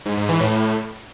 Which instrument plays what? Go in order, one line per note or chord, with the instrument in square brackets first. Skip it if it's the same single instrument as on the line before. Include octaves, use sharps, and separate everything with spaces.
[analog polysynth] G#2
G#2
E3
A2